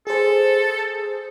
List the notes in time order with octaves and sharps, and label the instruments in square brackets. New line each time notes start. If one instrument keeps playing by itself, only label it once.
[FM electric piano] G#4 C5 [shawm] A4